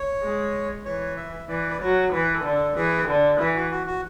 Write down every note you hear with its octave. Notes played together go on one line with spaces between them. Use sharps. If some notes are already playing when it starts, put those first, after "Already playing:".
Already playing: C#5
G#3
E3 C#5
E5
E3 D5
B4
F#3 C#5
E3 B4
A4
D3
A4
E3 G#4
D3
E3 E4
F#4
F#4
F#4